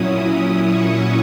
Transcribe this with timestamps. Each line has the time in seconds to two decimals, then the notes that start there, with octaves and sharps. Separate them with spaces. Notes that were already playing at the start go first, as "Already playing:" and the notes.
Already playing: A#2 F#3 C#4 E4 D#6
0.67 C#6